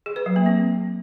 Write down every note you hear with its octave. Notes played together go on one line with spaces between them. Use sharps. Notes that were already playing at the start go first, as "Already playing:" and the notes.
G#4
B4
F#3
A#3
C4